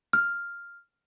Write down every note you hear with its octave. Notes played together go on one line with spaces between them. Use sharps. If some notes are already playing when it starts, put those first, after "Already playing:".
F6